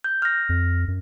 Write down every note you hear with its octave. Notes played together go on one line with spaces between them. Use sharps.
G6
F6 A#6
F2
F#2